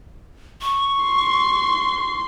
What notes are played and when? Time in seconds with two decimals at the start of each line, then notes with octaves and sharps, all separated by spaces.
0.62 C#6
1.05 C6